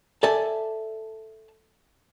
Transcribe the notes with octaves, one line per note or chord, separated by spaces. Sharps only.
A4 D5 E5 G#5 A5